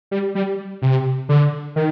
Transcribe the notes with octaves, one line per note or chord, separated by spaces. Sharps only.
G3
G3
C3
D3
D#3